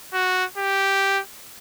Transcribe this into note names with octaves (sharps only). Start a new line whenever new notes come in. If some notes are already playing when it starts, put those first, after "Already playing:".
F#4
G4